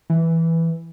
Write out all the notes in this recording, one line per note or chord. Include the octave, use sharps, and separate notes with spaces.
E3